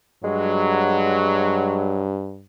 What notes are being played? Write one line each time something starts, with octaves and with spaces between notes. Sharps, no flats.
G2 F#3 G#3